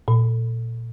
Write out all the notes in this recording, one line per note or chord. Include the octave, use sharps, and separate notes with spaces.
A#2